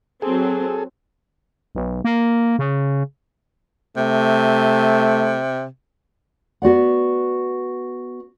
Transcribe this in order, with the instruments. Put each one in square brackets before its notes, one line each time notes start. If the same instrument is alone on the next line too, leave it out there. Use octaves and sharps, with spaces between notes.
[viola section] F#3 C4 [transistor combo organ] G#4 A4
[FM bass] B1
A#3
C#3
[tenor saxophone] C3 [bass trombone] A3
[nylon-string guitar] B3 F#4 D5 F#5